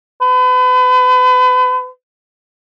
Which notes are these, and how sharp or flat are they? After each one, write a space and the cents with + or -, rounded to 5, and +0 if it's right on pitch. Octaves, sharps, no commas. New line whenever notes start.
B4 +35